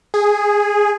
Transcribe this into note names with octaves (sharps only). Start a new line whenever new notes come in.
G#4